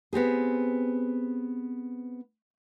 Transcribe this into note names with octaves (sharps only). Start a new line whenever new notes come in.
B3 C4 G4 G#4